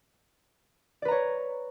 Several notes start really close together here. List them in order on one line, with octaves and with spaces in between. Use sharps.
D5 B4 A#5 C#5